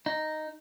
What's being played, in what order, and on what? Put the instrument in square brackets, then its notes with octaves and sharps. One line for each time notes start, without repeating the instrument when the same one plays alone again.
[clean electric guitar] D#4